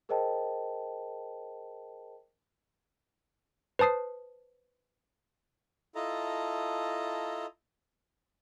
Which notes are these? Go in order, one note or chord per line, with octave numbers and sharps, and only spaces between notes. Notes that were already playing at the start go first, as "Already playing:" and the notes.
G#4 A#4 C5 D#5 G5 A5
B4 C5 A5 D#6 C7
E4 F4 A4 D#5 A5 A#5